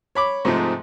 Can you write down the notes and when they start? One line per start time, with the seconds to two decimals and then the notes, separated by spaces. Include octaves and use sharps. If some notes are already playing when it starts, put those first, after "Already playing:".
0.15 C#5 B5 D6
0.45 G#2 C3 F3 G#3 A3